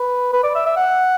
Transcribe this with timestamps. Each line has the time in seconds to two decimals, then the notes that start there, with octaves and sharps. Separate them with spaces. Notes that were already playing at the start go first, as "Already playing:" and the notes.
Already playing: B4
0.33 B4
0.43 D5
0.55 E5
0.66 E5
0.76 F#5